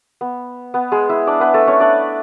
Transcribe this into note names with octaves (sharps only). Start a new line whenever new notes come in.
B3
B3
G#3 G#4
E4 E5
D4 D5
B3 B4
A3 A4
C#4 C#5
D4 D5